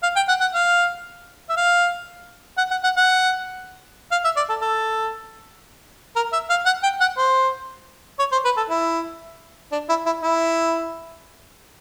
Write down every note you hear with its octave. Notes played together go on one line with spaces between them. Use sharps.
F5
G5
F#5
F#5
F5
E5
F5
F#5
F#5
F#5
F#5
F5
E5
D5
A4
A4
A#4
E5
F5
F#5
G5
F#5
C5
C#5
C5
B4
A4
E4
D4
E4
E4
E4